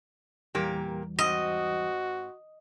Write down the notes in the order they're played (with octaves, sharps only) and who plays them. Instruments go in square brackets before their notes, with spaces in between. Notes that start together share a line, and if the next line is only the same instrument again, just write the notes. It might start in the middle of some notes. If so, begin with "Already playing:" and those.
[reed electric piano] E2 E3 G3 [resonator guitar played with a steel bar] A#2 A#3 G4
[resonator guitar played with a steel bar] G#2 C4 [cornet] F#4 [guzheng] D#5